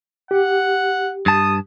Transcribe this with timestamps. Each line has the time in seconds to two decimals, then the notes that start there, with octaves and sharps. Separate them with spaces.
0.31 G4 F#5
1.26 G2 A5 D#6